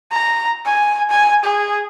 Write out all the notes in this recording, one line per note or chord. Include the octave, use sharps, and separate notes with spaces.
A#5
G#5
G#5
G#4